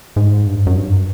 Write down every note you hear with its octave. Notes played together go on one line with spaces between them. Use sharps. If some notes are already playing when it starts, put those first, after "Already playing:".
G#2
G2
F#2
G2